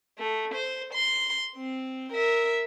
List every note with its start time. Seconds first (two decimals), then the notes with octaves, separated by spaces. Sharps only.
0.18 A3
0.54 C5
0.93 C6
1.56 C4
2.12 A#4 E5